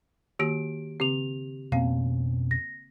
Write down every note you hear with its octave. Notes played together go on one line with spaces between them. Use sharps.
D#3 A#3 F#4 G4 D7
C#3 C4 G4 F7
F2 B2 A#3 C4 C#4 F5
A#6